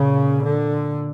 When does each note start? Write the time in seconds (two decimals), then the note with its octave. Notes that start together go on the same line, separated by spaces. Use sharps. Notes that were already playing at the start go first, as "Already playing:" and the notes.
Already playing: A#2 C#3
0.44 D3